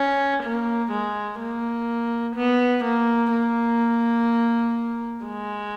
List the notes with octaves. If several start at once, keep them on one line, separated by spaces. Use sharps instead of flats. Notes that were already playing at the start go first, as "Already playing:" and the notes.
Already playing: C#4
A#3
G#3
A#3
B3
A#3
A#3
G#3